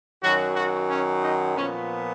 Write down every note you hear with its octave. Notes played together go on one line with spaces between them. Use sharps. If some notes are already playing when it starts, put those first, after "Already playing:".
F#2 D#3 F#3 F#4
F#4
C#4
D#4
A#2 F3 B3 C#4